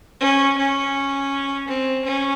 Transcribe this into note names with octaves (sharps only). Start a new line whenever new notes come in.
C#4
C#4
C4
C#4